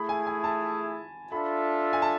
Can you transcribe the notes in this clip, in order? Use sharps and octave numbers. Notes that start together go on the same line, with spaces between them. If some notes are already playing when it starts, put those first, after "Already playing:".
Already playing: A3 E4 G#4 B5
G#5
G#5
A5
D4 F4 A4 E5 B5
G#5
A5